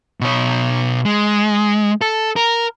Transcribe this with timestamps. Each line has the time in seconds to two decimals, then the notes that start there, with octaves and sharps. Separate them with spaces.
0.21 B2 C#5
1.05 G#3
2.01 A4
2.36 A#4